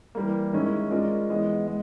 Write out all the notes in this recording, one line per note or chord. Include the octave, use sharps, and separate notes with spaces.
E3 G3 A#3
D#3 G#3 C#4 E4
G#3 C#4 F4 A#4 D5
E3 G#3 B3
G#3